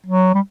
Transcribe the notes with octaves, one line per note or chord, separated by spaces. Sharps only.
F#3
G3